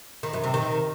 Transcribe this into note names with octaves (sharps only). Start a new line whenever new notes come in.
D#3
F#2
C3
D#3